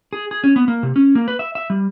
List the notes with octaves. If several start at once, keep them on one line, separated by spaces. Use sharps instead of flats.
G#4
G#4
C#4
B3
A#3
C3
C#4
A#3
B4
E5
E5
G3